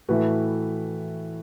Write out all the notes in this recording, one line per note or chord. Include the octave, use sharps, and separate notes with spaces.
A2 E3 A3 F#4 B4